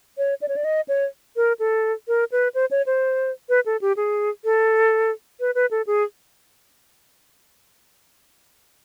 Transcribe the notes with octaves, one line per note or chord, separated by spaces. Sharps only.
C#5
D5
C#5
D5
D#5
C#5
A#4
A4
A#4
B4
C5
C#5
C5
B4
A4
G4
G#4
A4
B4
B4
A4
G#4